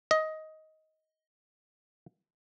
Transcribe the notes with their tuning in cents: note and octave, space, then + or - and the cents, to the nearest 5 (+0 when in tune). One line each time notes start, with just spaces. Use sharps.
D#5 +15